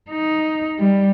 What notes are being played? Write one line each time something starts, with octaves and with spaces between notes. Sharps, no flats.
D#4
G3